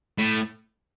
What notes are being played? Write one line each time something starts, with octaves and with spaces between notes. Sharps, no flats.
A2